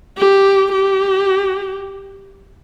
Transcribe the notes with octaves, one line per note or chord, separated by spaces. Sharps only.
G4
G4